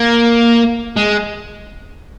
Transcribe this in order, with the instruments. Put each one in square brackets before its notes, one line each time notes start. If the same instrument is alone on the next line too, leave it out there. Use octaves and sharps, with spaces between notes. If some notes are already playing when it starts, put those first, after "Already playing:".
Already playing: [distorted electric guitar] A#3
G#3